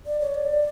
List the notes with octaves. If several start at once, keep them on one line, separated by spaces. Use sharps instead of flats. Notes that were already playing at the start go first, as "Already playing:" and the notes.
D5
C#5
D5